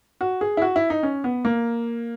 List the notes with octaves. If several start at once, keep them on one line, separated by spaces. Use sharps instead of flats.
F#4
G#4
E4
F#4
E4
D#4
C#4
B3
A#3